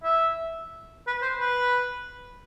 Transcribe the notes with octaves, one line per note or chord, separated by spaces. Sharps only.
E5
B4
C5
B4